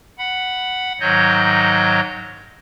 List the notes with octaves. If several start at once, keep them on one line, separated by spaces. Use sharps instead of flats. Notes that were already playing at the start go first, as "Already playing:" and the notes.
F#5 B5
G#2 D#3 F#3 C#5 D#5 G6